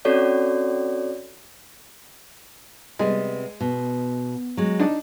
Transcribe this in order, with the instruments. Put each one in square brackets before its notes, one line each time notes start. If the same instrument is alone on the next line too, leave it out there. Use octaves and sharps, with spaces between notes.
[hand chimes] C4 C#4 F#4 A4 C#5 D5
[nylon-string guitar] C3 G3 B3 [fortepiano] G#3
[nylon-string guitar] B2
F#3 G#3
[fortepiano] D4 D#4